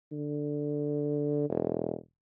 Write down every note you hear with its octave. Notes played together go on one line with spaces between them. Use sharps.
D3
E1